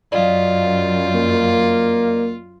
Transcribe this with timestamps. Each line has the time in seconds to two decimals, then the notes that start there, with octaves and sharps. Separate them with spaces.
0.12 F#2 F4 D5 D#5 F5
1.15 A#3